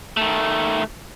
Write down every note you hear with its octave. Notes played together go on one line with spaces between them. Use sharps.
D#3 A3